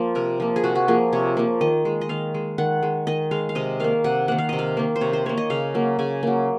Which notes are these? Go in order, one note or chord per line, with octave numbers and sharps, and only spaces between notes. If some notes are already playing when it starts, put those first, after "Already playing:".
Already playing: F3 A#3 F4
C3 A#4
F3 A#3
G#4
C3 F#4
F#4
F3 A#3 G#4
C3 C#5
F3 A#3
D#3 D#5
G#3
D#5
D#3 F5
G#3
D#3 F#5
G#3
D#3 D#5
G#3 F5
F5
C3 D#5
D#3 A#3 F5
C3 F#5
D#3 A#3 F#5
F5
C3 D#5
F5
D#3 A#3
C5
C3 C#5
C5
D#3 A#3 C#5
D#5
C#3 F5
F#3 A#3
C#3 G#5
F#3 A#3